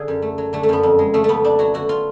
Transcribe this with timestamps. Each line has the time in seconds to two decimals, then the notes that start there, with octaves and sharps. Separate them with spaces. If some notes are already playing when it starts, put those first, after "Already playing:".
Already playing: D3 G#4
0.08 F#2
0.22 A3
0.38 F#3
0.53 D3 A3
0.63 A3
0.69 F#2 B3
0.83 F2
0.99 G#3
1.14 C#3 A3
1.24 F2 A3 B3
1.44 F2 D4
1.59 F#3 F#4
1.74 D3 F#4
1.89 F4